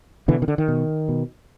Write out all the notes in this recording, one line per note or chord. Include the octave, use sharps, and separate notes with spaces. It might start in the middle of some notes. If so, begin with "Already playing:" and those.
B2 D3 E3
D#3
D3
D#3
B2
B2